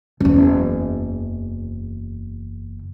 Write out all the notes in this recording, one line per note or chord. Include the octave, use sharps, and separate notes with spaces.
F#1 E2